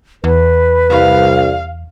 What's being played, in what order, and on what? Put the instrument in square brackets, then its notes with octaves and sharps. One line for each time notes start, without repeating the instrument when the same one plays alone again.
[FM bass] E2 [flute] B4
[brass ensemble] C2 [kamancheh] F5